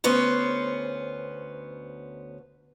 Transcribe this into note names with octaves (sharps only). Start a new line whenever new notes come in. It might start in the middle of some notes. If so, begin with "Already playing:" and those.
D2 B3 C#4 C5